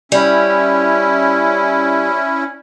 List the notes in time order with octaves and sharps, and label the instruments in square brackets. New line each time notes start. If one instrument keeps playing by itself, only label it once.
[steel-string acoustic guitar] G3 [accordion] C#4 E4